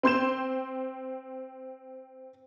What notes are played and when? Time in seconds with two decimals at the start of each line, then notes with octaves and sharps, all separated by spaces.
0.03 C4 C6 G6 E7